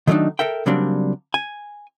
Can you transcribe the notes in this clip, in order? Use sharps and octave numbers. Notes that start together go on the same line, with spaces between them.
D#3 F#3 A3 A#3 D4 D#4
A4 A#4 E5 G5
C#3 F#3 G3 A#3 C4 D4
G#5